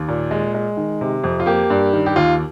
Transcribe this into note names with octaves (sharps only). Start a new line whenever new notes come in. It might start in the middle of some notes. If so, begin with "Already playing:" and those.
Already playing: D#2
A#2
G#3
G#3
D#3
C3
F2
F4
A#3 G4
G2
D#3
G4
D#2 F4